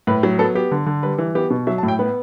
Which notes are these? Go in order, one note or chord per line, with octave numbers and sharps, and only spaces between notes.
A2 B4
F#3
B3 A4
B3 G4
D3
D3
G3 B4
E3
B3 G4
B2
F#3 E5
A5
A2
G5
B3 B4